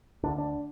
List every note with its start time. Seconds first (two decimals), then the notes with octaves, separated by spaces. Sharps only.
0.23 D2 D4
0.26 D3
0.38 D4